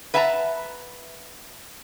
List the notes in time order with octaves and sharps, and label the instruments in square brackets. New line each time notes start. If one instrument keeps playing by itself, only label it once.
[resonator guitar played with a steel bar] B4 E5 F#5 A5 A#5